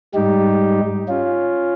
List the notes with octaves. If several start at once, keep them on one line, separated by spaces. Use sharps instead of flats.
G#2 G3 D#4 G4
C#4 F4